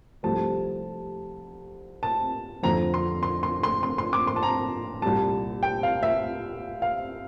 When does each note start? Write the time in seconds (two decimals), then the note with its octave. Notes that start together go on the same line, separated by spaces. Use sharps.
0.23 C2 C3 F3 A3 A5
2.03 A5
2.63 F2 D3 F3 A#5
2.94 C6
3.23 C6
3.43 C6
3.63 C6
3.83 C6
3.98 C6
4.13 D6
4.27 C6
4.36 A5
4.43 A#5
5.02 C2 A#2 G3 A5
5.63 G5
5.83 F5
6.03 E5
6.82 F5